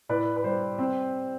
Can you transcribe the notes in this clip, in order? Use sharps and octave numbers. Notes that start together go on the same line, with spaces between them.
A2 B4 D5
B4
G3 C5
C4